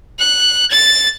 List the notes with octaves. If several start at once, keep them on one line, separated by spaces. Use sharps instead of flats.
F#6
A6